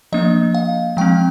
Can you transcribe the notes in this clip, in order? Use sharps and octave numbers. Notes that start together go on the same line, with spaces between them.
F3 A#3 D4 D#5
F5
F3 G#3 C4 G5